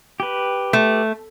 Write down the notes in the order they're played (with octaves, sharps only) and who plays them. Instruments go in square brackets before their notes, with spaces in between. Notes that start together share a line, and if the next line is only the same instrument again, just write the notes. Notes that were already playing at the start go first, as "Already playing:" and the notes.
[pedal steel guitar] G4 B4
[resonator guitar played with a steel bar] A3